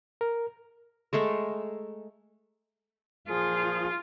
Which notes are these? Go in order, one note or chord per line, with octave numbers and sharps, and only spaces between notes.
A#4
G#3 A3 A4 A#4
A#2 F3 F4 G#4